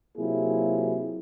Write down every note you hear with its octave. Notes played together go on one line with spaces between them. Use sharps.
C3 F#3 A#3 E4 F4 G#4